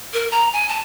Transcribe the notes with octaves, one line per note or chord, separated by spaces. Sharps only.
A#4
A#5
G#5
A5